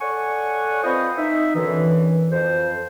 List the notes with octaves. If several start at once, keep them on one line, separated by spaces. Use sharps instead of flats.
A4 C#5 D5 F#5 G#5 C#6
C4 F4 B4 C5 D#5 D#6
D#4 E5
F#2 B2 D3 E3
F2 C5